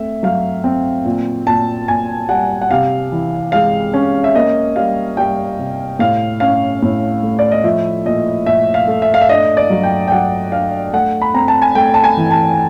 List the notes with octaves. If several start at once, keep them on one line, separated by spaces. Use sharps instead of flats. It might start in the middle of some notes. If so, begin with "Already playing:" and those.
Already playing: A3 C4 E5
F#3 F5
C4
A#2
A#2 A5
A#2 G#5
G3 F#5
F#5
C3 F5
E3
G#3 F5
C#4
E5
A#3 D#5
G3 F5
G3 G5
C3
A2 F5
C#4 F5
A2
A3
D5
D#5
F3 E5
A#2 D#5
A#2 E5
F5
A3
E5
F5
E5
D4 D#5
D5
F#3
G5
G5
F#3 F#5
D4 F5
A3 F#5
B5
C4 A#5
A5
G#5
A3 G5
A5
G#5
E3
A5